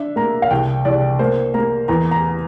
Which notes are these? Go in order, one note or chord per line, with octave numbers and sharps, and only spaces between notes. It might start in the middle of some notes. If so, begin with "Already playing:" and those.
Already playing: D4 E5
A#3 A#5
F5
C2 G5
C2 D5
A#3 C5
A#3 A#5
E2 A#5
A#5